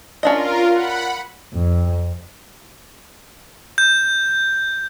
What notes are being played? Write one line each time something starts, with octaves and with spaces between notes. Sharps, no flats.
C#4 D4 F4 A#4 D#5
F#5 B5
F2
G6